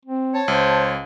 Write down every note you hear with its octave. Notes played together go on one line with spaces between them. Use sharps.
C4
C#5 A5
C#2 C5